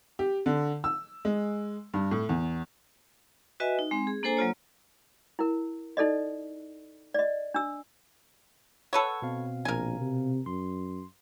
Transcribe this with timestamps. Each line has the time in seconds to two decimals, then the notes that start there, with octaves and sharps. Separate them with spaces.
0.19 G4
0.46 D3
0.84 E6
1.25 G#3
1.94 G2
2.11 A2
2.29 E2
3.60 F#4 B4 D#5 E5 G#5
3.79 D#4
3.91 G#3 C4
4.07 G#4
4.23 A#3 D4 A4 C5 G#5 A#5
4.37 F#3 A#3 F4 C#5
5.39 E4 A#4
5.97 D#4 A4 D5 D#5
7.14 D5 D#5
7.54 D4 E6
8.93 A4 B4 C#5 F#5 C#6 E6
9.22 B2 C4 F5
9.65 A#1 A#4 G#5
10.00 C3
10.46 F#2 C6